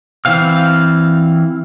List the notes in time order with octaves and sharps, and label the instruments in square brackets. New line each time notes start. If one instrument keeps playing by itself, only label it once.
[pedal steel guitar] E3 C4 F5 F6